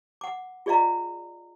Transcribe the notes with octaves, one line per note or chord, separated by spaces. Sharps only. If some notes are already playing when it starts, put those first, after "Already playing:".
F#5 D6
F4 G#4 D5 D#5 F5 A#5